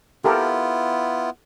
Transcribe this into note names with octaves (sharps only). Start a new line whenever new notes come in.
B3 E4 F4 G4 A4 A#4